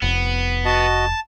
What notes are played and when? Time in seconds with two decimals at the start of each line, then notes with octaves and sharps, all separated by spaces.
0.02 F1 B3
0.65 F#4 D#5 A5